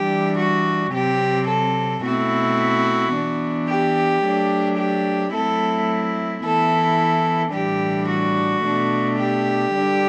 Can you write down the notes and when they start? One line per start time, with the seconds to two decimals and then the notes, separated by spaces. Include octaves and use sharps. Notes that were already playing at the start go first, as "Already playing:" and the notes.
Already playing: E3 G3 D4 G4
0.38 F#4
0.93 C3 F#3 C4 G4
1.47 A4
2.03 B2 A3 C4 E4 F#4
3.13 E3 B3 D4
3.68 G4
4.23 F#3 A3 D4
4.78 G4
5.33 F#3 A3 C4 E4 A4
6.43 E3 B3 E4 A4
7.53 A2 E3 G3 D4 G4
8.08 F#4
8.64 B2 A3 D4
9.18 G4
9.73 D3 G3 D4